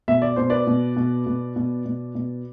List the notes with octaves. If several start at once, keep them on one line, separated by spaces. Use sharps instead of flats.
B2 E5
D5
B2 C5
B4 D5
B2
B2
B2
B2
B2
B2